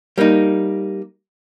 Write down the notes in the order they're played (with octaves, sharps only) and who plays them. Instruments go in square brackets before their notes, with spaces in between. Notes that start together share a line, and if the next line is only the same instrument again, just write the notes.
[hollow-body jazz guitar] G3 A#3 C4 D#4